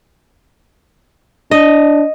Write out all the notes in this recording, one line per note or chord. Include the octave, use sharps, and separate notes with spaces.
D4 D#5